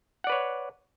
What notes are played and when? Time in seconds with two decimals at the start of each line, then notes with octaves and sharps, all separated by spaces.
0.24 F#5
0.27 D5
0.29 B4
0.32 C#5